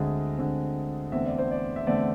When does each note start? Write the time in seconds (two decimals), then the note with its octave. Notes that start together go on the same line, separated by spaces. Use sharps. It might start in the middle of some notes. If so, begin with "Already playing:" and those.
Already playing: D2 D3 G#3 C4 G#4
0.38 D2 D3 G#3 C4
1.12 E2 D3 A3 C4 E5
1.26 D5
1.38 C5
1.51 D5
1.76 E5
1.86 E2 D3 A3 C4 D5